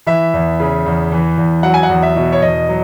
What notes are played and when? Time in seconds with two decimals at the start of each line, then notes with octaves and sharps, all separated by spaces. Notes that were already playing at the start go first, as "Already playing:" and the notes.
0.07 E3 E5
0.34 E2
0.60 C#3
0.86 E2
1.12 E3
1.38 E2
1.63 F#3 F#5
1.74 G#5
1.83 F#5
1.89 E2
2.03 E5
2.16 B2
2.32 C#5
2.42 E2 D#5
2.68 F#3